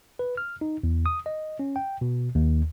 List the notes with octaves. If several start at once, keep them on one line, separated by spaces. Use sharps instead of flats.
B4
F6
D#4
E2
D#6
D#5
C#4
G5
B2
D#2